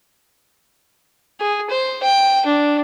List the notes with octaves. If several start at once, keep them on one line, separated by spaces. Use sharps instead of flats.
G#4
C5
G5
D4